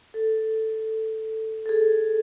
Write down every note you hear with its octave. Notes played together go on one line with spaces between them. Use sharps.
A4
A4
G#4